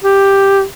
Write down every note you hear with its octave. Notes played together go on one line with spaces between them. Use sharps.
G4